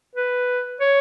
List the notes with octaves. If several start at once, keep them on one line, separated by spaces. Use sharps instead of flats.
B4
C#5